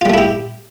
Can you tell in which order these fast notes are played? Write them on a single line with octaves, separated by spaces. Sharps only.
F4 G3 A3 E4 G4